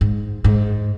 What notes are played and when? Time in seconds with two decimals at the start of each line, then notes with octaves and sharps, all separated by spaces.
0.01 G#2
0.44 G#2